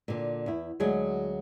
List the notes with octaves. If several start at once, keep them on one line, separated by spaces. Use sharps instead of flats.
A#2 D3
E2 E4
D2 F#3 G#3 G#4